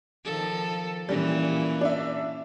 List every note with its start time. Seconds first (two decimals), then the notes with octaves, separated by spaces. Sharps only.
0.25 D#3 F3 A4
1.09 A#2 E3 G3 C#4
1.81 D4 E5